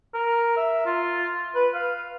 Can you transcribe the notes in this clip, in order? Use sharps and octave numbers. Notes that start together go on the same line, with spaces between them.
A#4
E5
F4
B4
F5